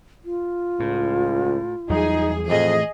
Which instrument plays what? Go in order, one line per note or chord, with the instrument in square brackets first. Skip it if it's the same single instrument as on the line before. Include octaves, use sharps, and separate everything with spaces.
[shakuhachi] F4
[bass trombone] C#2 [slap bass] A2
[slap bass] E2 F#3 G3 [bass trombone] D#4 [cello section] G#4
[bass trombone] F2 [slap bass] A2 E3 [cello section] G#4 D#5